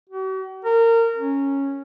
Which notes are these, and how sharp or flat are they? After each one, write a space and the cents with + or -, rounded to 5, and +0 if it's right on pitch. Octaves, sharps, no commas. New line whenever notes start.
F#4 +45
A#4 -25
C#4 -5